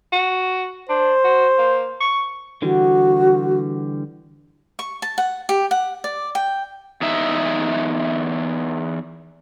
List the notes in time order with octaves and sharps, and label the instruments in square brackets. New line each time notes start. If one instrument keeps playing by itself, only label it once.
[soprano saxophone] F#4
[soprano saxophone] D4 [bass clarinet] C5
[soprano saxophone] F#4
A#3
C#6
[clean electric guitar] D3 E3 G3 [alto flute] F#4
[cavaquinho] C#6
A5
F#5
G4
F#5
D5
G5
[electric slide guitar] E2 D#4 E5